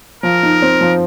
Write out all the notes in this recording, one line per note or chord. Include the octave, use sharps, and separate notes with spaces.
F3 A#4
D#4
C4
F3